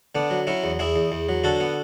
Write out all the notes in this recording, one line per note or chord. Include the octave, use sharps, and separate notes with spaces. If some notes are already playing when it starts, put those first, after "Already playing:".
D3 B3 D4
F#3
F#3 C#4 E4
E2
E2 E4 G#4
E2
E2
F#3
D3 F#4 A4
B3